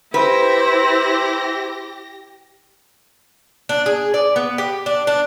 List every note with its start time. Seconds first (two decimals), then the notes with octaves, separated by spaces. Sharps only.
0.14 E4 G4 B4 C5 A#6
3.69 D4
3.86 G#4
4.14 D5
4.36 B3
4.58 G4
4.86 D4
5.07 D4